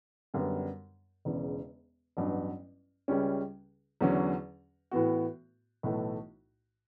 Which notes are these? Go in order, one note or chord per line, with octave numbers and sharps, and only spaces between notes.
F#2 D3 G3 B3
E1 E2 C#3
A1 G2 F#3 B3
C#2 C#3 G3 C#4
E2 D3 F#3 C#4
A2 E3 B3 F#4
B1 A2 E3 A3